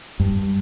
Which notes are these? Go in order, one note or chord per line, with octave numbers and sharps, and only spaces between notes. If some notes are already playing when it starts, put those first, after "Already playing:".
G2